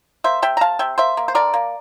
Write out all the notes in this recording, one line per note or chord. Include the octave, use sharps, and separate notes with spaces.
A#3 C5 E5
C3 E5 G5
A#5
C3 F5 A5
C3 E5 G5
A#3 C5 E5
A#3
C5
D3 A#4 D5
A#3